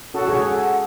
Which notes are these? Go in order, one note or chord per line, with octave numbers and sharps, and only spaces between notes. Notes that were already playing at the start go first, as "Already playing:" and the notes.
C#4 F#4 A4
F#4 G#4 C#5
A4 F#5